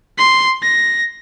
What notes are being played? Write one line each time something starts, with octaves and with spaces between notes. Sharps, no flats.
C6
A#6